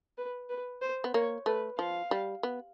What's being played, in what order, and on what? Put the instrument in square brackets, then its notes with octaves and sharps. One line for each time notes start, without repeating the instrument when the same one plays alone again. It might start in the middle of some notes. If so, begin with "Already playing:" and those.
[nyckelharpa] B4
B4
C5
[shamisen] B3
[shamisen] A#3 [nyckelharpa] C#5
[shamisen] A3 [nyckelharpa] B4
[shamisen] F3 [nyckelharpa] F5
[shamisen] G3
B3